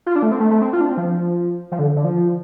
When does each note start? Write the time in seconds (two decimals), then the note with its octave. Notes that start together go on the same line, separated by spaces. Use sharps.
0.06 F4
0.16 D4
0.23 A3
0.31 C4
0.40 A3
0.51 A3
0.62 C4
0.73 F4
0.81 D4
0.90 C4
0.97 F3
1.72 F3
1.79 D3
1.96 D3
2.05 F3